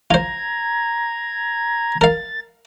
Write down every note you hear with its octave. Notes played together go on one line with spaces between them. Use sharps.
F4 C5 A#5 G#6
A#4 F5 A6